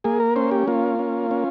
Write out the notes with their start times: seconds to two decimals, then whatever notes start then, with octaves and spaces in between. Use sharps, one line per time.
0.04 A#3 G#4
0.20 A#4
0.36 C#4 C5
0.51 G4
0.67 A#3 F4
0.99 C#4
1.31 C#4